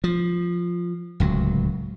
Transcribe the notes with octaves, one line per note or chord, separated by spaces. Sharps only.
F3
D1 C#2 F#3